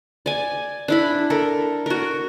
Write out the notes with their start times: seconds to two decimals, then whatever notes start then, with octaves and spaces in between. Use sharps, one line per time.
0.26 D5 G#5
0.88 D4 E4 B5
1.30 A4 A#4
1.86 F#4 A#4